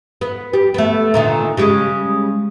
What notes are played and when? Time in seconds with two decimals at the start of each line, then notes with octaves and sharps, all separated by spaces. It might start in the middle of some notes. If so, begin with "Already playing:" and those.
0.21 B3
0.53 G3
0.74 A3 B3
1.14 A#2 D3 D#3
1.57 C#3 G3 G#3